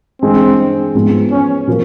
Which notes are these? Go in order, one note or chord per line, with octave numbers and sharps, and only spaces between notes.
G2 E3 G#3 C4
G#2 F3 G#3 B3
C#4
A#2 F3